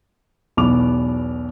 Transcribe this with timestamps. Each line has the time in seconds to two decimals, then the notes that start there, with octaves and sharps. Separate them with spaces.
0.57 B1 E2 B2 B3 D6 F7